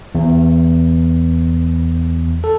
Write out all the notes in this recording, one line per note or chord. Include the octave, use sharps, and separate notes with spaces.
E2
A4